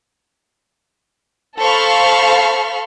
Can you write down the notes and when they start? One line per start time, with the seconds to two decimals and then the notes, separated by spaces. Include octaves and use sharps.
1.60 A4 C5 F5 B5 C#6 F6